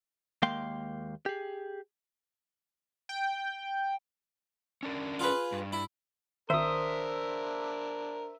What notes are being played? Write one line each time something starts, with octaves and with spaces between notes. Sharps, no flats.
D#2 G#3 A#3 F5 G5 C6
G4 G#4
G5
C#4 D4 A#4
F4 G#4 B4
G2
E4
G#1 D#3 D4 A#4 C5 E5 D#6